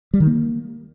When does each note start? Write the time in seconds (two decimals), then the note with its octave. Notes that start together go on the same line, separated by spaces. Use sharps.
0.14 G3
0.20 D#3
0.27 A#3